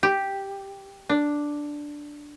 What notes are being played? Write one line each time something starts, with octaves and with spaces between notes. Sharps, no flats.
G4
D4